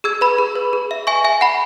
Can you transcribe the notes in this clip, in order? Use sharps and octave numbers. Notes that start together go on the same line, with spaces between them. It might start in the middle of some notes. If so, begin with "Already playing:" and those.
G#4 E6 G#6
B4 B5
G#4
B4
G#4
E5
E5 G#5 C#6
E5 G#5
F#5 B5